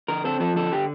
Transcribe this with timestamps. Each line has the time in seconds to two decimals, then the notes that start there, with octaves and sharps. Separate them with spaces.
0.08 D3 A#4
0.24 C4 A4
0.40 F3 A4
0.56 D3 A4
0.72 D3 G4